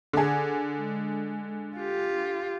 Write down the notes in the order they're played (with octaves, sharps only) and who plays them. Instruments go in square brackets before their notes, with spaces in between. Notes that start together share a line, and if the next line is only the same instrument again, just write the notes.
[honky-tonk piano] D3 G#4
[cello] G#3
F4 G4